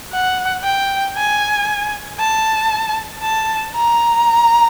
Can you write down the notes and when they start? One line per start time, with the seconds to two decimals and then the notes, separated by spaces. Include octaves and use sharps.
0.13 F#5
0.64 G5
1.17 G#5
2.20 A5
3.23 A5
3.75 A#5